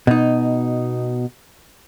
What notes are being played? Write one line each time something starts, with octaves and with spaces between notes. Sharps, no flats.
B2 D#4